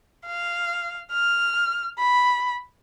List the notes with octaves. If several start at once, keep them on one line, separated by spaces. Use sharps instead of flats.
F5
F6
B5